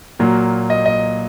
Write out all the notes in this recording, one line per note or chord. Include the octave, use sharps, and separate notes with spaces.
A#2 F#3 A#3
D#5
D#5